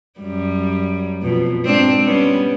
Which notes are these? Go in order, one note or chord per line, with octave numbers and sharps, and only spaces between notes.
F#2 G3
F2 B2
G#2 C4 D4
G3 B3 C#4